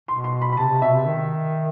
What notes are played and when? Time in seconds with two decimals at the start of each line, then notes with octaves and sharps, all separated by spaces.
0.08 B2 C6
0.24 C6
0.42 B5
0.52 B5
0.57 C3 A5
0.69 C3
0.82 B2 E5
0.94 C3
1.06 D#3